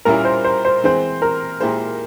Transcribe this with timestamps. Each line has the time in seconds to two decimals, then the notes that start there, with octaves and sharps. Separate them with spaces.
0.05 A#2 G3 A#3 C#4 E4 A#4
0.25 C5
0.44 C5
0.65 C5
0.84 E3 G#3 C4 C5
1.22 A#4
1.61 A#2 G#3 E4 G4 C5